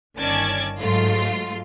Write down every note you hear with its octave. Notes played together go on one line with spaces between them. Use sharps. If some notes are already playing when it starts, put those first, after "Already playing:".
G1 D#3 C#4 D5 A5 G#6
G#2 F#3 A3 F4